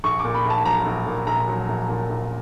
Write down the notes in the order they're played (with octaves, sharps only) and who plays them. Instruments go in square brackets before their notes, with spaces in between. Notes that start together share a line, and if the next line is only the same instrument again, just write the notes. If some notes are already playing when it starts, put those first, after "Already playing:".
[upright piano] A#1 C#6
A#2 D6
B5
A#1
A5
F#3 A#5
A#1
A#2
A#1 A#5
F#3
A#1
A#2
A#1